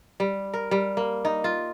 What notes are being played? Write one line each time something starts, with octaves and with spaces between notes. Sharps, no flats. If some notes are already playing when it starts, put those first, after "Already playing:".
G3
A#4
G3
A#3
D#4
F4